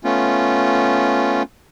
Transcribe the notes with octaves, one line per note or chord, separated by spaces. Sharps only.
A3 B3 C#4 F4